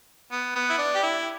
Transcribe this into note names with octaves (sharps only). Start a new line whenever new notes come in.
B3
B3
E4
D4
G4
E4